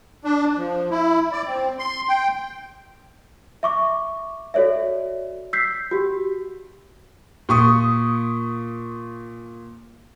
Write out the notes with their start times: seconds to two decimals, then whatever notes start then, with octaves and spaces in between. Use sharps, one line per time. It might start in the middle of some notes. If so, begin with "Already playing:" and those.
0.24 D4
0.58 F3
0.90 E4
1.32 D5
1.47 C4
1.79 C6
2.09 G5
3.63 E5 C#6 D6
4.54 F#4 A4 C#5 D5 E5
5.53 E6 G6 B6 C7
5.91 F#4 G4
7.49 A#2 C#6 D#6